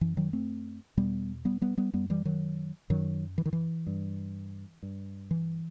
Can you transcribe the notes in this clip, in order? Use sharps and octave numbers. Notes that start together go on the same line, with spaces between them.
F#2 E3
D#3 F#3
A3 C4
E2 B2 G3 B3
G3 B3
G3 B3
G3 B3
F#2 G3 B3
E3 G3
D#3 F#3
F#2 D#3 F#3
E3
D#3
E3
G2
G2
E3